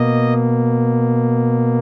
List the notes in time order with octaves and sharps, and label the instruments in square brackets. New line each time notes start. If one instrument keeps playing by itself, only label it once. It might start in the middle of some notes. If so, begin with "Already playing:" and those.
Already playing: [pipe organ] B2 A#3 D#5